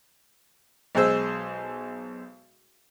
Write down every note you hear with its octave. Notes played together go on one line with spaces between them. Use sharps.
B1 G#3 G#4 C5 E6